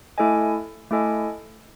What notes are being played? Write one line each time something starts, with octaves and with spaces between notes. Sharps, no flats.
A3 E4 A4 D#5 G#5
A3 E4 A4 D#5 G#5